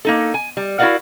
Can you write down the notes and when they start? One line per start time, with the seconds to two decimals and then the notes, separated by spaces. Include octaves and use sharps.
0.05 A#3 D#4 A4
0.34 G#5
0.57 G3
0.79 E4 F#4 A#4 D5 F5 F#5